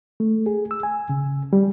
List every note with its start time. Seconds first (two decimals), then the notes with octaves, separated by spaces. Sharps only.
0.20 A3
0.46 G#4
0.71 E6
0.83 G#5
1.09 C#3
1.53 G3